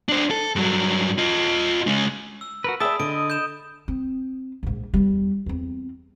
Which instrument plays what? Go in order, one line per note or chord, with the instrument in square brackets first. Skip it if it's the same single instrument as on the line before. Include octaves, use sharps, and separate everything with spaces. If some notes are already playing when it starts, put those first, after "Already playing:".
[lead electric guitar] D4 C5
A4
G2 F#3
F4 D#5
G#3 C#4
[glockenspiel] E6
[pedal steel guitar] F#4 A#4 B4
[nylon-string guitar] G#4 D5 [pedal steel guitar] E5 G5 A5 [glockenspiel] B5 D#6
[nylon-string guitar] D3 [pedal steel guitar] D#5 [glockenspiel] D7
[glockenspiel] G6 E7
[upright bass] C4
A#1 G#2
E2 G3
E2 C4